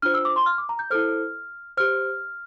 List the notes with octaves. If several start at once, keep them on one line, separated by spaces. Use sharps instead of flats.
D4 F4 C5 F6
E6
D6
C6
F6
D6
A#5
G6
E4 A4 C5 F6
G4 C5 F6